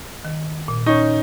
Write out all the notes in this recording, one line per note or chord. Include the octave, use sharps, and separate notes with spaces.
D#3
A#2
C#4 D#4 C#6